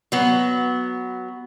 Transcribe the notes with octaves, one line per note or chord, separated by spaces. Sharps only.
F#3 B3